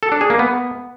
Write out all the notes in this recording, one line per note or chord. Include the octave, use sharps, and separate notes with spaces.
A4
D4
G#4
A#3
B3